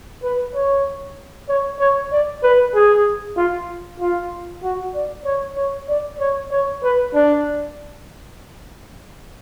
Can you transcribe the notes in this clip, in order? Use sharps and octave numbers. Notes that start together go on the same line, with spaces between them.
B4
C#5
C#5
C#5
D5
B4
G#4
F4
F4
F#4
D5
C#5
C#5
D5
C#5
C#5
B4
D4